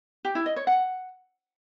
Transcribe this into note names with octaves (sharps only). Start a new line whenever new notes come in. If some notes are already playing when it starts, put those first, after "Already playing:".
G4
E4
D#5
C#5
F#5